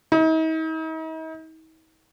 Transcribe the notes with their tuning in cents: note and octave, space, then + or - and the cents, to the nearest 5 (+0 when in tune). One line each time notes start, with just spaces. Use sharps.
D#4 +45